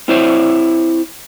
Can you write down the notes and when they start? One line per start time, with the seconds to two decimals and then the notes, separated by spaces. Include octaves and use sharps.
0.08 C4 E4 C5 C#5